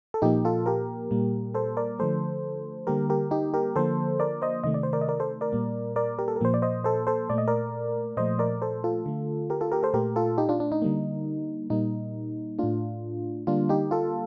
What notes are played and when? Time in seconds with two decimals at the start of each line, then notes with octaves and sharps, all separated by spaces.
0.14 A4
0.22 A#2 F3 A#3 D#4 G4
0.45 F4 A4
0.66 G4 A#4
1.11 A#2 G3 A#3
1.54 A4 C5
1.77 A#4 D5
1.99 D3 F3 A3 A4 C5
2.87 D3 G3 A#3 G4 A#4
3.10 G4 A#4
3.31 D#4 G4
3.54 G4 A#4
3.76 D3 F3 A#3 A4 C5
4.20 A#4 D5
4.42 C5 D#5
4.64 C3 D#3 A3 D#5
4.74 D5
4.83 C5
4.93 A#4 D5
5.01 D#5
5.09 A#4 D5
5.20 A4 C5
5.41 A#4 D5
5.52 A#2 G3 A#3
5.96 A#4 D5
6.19 G4 A#4
6.28 A4
6.36 A#4
6.41 A#2 F3 A#3 C5
6.54 D5
6.62 C5 D#5
6.84 A4 C5
7.07 A4 C5
7.30 A#2 A3 D5
7.38 D#5
7.48 A#4 D5
8.17 A#2 F3 A3 C5 D#5
8.39 A#4 D5
8.62 A4 C5
8.84 F4 A4
9.06 D3 A3
9.50 G4 A#4
9.61 F4 A4
9.72 G4 A#4
9.83 A4 C5
9.94 A#2 A3 G4 A#4
10.16 F4 A4
10.38 D#4 G4
10.49 D4 F4
10.60 D4
10.72 D#4
10.82 D3 G3 A#3
11.70 A#2 G3 A#3 D#4
12.59 A2 A3 D4 F4
13.47 D3 G3 A#3 D4 F4
13.69 D#4 G4
13.91 F4 A4